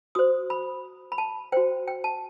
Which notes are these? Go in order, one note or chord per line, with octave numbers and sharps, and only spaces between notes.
F#4 C5 D#6
B5
B5
A5
F#4 C5 G5
G5
A5